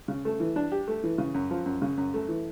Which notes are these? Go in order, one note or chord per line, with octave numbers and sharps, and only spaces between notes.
C#3
A3
E3
D4
G4
A3
E3
C#3
F#2
F3
F#2
C#3
F#2
A3
E3